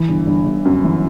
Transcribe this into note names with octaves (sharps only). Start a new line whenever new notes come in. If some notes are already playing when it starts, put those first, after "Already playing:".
Already playing: E3
G1
G1
G1
F#2
E3